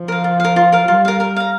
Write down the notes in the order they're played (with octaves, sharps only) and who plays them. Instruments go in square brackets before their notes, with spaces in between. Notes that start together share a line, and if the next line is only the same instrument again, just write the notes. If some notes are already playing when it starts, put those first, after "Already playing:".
Already playing: [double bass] F3
[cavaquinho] A#4 F5
F4
A#4 F5
F4
A#4 F5
[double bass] G3 [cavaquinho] F4
[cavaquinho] A#4 F5
A#4
F5 A#5